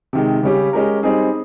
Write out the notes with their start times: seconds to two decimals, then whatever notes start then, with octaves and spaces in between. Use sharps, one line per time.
0.13 C3 D#3 G#3
0.43 C#3 G3 C#4 G4
0.73 G#3 C#4 G4 A#4
1.03 G3 C4 D#4 G#4